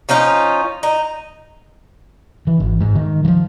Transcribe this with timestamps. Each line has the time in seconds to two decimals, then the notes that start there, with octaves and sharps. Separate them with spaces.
0.09 F3 C#4 D#4 F4
0.83 D#4
2.47 E3
2.60 G#1
2.80 G#2
2.95 D#3
3.25 E3 F3